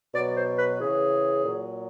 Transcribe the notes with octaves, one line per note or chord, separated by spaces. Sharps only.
B2 F#3 D5
C5
B4
C#3 E3 G#4
A#2 F#3